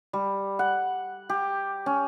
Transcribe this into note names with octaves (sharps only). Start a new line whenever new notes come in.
G3
F#5
G4
C#4